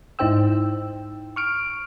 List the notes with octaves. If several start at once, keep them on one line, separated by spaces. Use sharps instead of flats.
G#2 D#4 E4 C5 G5 E6
C#6 F6 D7